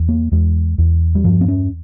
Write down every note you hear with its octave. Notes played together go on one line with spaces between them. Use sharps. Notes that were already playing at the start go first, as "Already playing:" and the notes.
Already playing: E2
A#3
E2 G#3
E2
G3
G2 F3
C4
C#4